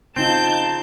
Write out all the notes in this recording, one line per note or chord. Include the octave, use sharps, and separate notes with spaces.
C#3 C4 D#4 F4 A5 G6